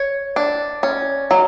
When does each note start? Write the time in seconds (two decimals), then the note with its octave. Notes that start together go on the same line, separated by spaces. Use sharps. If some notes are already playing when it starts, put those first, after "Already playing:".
Already playing: C#5
0.36 D4
0.83 C#4
1.31 F#3